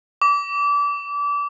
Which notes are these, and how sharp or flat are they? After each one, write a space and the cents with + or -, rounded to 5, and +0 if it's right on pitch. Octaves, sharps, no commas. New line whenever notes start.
D6 -30